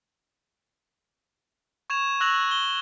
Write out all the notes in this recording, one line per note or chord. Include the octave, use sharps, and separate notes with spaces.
C#6 G#6 E7 F7
C#6 E6 F#6 A#6 F7 F#7
G7